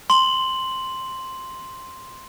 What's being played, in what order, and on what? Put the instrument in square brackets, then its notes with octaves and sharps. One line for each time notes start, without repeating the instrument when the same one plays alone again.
[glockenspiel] C6 F#7